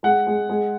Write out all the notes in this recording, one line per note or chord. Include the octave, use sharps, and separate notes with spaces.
G#3 F#5
G#3
G#3